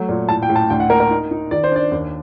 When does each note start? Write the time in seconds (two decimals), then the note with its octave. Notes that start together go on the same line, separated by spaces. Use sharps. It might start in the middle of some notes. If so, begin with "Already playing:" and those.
Already playing: F#3 A3
0.09 A#2
0.29 A2 A5
0.42 G5
0.49 A2
0.56 A5
0.70 D2 G5
0.80 F#5
0.90 A#3 A#4
1.00 A#4
1.11 D#4
1.31 D#4
1.51 D#3 D5
1.64 C5
1.72 D4 D5
1.91 D#2